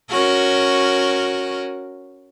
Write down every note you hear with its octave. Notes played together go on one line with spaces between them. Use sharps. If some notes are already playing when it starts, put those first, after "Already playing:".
C#4 F#4 A#4